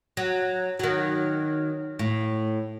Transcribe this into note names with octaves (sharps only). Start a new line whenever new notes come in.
F#3
D#3 F#3
A2